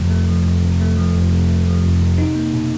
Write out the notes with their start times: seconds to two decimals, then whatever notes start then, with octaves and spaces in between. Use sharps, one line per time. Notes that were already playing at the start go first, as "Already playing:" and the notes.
Already playing: F2 C3 F3 A3
0.11 A3
0.28 F3
0.45 F2
0.62 C3
0.81 A3
0.97 F3
1.15 F2
1.32 C3
1.49 A3
1.67 F3
1.85 F2
2.02 C3
2.18 D#4
2.35 A#3
2.54 B2